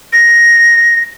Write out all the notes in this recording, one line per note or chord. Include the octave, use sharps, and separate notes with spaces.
A#6